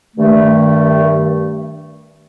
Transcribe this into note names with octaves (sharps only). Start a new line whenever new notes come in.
G2 D#3 A3